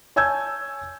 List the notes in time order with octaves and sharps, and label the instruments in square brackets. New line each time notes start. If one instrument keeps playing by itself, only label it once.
[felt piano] C#5 G#5 A5 E6 G6 G#6